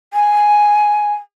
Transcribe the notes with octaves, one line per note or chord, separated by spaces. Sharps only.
G#5